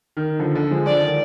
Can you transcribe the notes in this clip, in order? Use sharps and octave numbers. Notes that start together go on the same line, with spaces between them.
D#3
D3 F3
D3
F3 G#3
D3 F3 D5
D#3